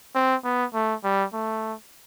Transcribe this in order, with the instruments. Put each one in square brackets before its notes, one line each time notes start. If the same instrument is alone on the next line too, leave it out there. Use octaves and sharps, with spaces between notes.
[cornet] C4
B3
A3
G3
A3